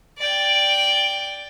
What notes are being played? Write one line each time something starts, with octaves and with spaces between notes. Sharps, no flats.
D5 G5